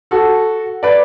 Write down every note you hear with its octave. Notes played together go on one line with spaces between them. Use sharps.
F#4 A4
B4 D5